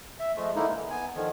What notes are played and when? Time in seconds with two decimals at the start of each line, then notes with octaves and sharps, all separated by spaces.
0.19 E5
0.36 F3 G#3 A3
0.55 D3 G#3 A#3 D#4 E4
0.73 E3
0.90 B3 G#5
1.16 D3 D#3 F3